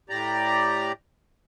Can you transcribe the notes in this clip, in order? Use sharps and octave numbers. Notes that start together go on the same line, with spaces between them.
A2 G4 D5 A#5